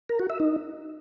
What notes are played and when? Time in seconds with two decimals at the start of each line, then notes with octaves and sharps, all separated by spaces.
0.09 A#4
0.20 F#4
0.30 E5
0.40 D#4